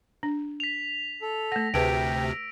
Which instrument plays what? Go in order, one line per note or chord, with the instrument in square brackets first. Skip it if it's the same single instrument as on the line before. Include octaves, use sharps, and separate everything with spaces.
[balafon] D4
[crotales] B6 F7
[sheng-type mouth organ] A4
[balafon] A3 F#5 [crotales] A#6
[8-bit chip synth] D2 C3 [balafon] G#4 B4 A5 [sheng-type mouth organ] G5 [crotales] E6 D7